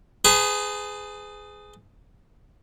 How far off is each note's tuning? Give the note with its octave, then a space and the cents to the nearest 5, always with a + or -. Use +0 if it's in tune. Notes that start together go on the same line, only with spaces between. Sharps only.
G#4 +0 B4 +45 A5 +30